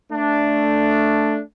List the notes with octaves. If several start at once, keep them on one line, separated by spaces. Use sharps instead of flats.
A3 D4